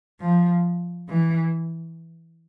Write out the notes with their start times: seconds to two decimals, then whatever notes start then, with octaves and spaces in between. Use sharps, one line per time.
0.20 F3
1.09 E3